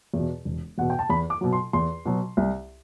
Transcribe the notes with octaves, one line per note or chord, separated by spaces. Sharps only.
E2 B2
E1
E2 B2 F#5
G5
A5
E2 B5
D6
B2 F#3
C6
E2 C6
B2 F#3
C2